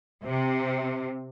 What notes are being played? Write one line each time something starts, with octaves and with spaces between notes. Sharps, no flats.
C3